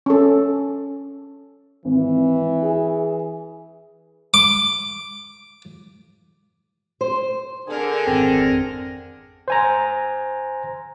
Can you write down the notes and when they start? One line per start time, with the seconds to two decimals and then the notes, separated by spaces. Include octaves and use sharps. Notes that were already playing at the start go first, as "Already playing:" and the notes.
0.06 C#4 A4
1.85 G#1 E3
2.62 G#4
4.34 D6
7.01 C5
7.68 D3 G#4 A#4
8.07 G#1 F2 C4 G5 A#6
9.48 C5 G#5 A#5